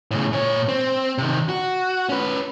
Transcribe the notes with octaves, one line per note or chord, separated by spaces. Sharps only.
A2 C#3
A#2 C#5
C4
C3 D#3
F#4
C#4 B4